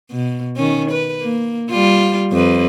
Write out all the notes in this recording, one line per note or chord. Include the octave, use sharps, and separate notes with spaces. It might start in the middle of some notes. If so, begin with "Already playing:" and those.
B2
D#3 C#4
B4
A#3
G3 F4
F2 B4